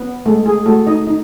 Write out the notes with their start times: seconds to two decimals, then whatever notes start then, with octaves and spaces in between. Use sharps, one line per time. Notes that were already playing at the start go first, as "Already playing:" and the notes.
Already playing: B3
0.25 G#3 A3 A4
0.46 G#4
0.66 A3 F#4 A4
0.87 D#4 D#5
1.07 D#4